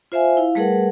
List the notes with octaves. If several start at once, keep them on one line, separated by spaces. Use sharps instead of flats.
F4 C5 E5 F5 G#5
E4 F5
G3 A3 G#4 A#4 B4 F#5